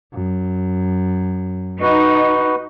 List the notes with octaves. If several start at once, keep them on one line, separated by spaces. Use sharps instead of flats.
F#2
D#4 F#4 B4